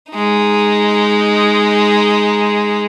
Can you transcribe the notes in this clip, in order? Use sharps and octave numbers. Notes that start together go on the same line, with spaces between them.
G#3 D#4